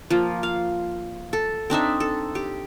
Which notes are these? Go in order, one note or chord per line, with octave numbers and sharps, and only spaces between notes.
F3 A#3
F5
A4
C4 D4 D#4 E5
A4
G4